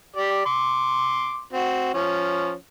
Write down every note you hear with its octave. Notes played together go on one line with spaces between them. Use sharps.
G4 D5
C6 D6
C4 F#4
F3 C#4